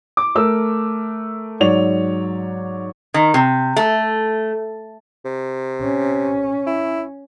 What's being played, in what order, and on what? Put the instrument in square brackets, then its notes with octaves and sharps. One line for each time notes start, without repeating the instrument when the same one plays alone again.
[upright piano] D6
A3 A#4 E6
G#2 F#3 C#5 D5 F7
[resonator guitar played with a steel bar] D#3
C3
A3
[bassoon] C3
[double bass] C#4
[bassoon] E4